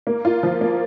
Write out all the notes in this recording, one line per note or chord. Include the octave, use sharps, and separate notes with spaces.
A#3
F4
F3
A#3